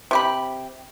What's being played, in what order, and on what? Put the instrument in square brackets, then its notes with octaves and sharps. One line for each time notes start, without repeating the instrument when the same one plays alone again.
[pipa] C3 G4 B5